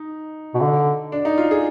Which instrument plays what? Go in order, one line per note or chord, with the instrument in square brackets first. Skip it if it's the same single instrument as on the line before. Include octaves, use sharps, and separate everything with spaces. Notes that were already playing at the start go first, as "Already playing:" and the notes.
Already playing: [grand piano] D#4
[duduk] B2
D3
[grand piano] D4
D#4
F4
G#4